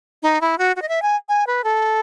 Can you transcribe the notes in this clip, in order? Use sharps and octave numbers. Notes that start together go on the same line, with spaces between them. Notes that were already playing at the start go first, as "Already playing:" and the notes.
D#4
E4
F#4
F#4
D#5
E5
G#5
G#5
B4
A4